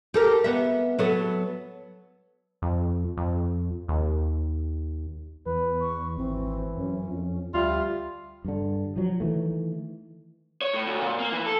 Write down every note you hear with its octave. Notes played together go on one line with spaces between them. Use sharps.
G4 A4 A#4
B3 E5
F#3 B3 A4
F2
F2
D#2
E2 B4
C#6
G#1 E3 C4
F#2 C#4
F2
D2 G3 F4 E5
G2 D3
F3 F#3
D#3 E3 A3
C#5
A2
D2
A#2
A#3
E3
A4